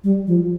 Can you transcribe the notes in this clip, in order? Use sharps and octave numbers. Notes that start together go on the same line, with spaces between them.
G3
F3